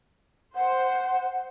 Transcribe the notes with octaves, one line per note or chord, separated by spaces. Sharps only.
C5 F#5